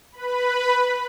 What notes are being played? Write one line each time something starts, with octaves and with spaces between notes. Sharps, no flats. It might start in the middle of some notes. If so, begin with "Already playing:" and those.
B4 B5